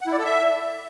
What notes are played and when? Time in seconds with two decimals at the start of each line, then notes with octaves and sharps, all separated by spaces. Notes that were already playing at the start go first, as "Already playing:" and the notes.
0.01 F#5
0.07 E4
0.13 D5
0.19 A4
0.25 E5